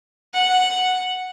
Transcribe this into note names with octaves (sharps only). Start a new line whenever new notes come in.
F#5